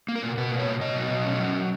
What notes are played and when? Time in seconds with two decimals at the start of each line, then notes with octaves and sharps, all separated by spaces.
0.08 A#3
0.16 A#4
0.23 B2
0.37 B2 B4
0.51 A#3
0.59 C#5
0.67 B2
0.81 B2 D#5
0.96 F#3
1.11 B2
1.26 C#4
1.40 F#3